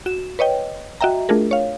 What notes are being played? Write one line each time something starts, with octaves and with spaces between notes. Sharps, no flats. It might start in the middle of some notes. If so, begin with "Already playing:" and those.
F#4 E7
B4 C#5 D#5 G5
F#4 D#5 E5 G5 A#5
A3 D4 F4 G#4 A#4
C#5 F5